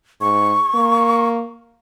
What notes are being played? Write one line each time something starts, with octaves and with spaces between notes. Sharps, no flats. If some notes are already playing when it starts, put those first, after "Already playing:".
G#2 C#6
A#3